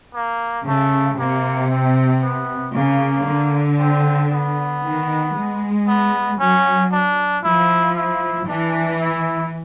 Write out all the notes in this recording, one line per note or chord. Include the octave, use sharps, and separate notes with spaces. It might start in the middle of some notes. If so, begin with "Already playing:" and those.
A#3
C#3 A3
C3 A#3
C4
B3
C#3 A#3
D3
C4
B3
D#3
G#3
B3
F#3 C#4
D4
F3 E4
E4
E3 D4
E4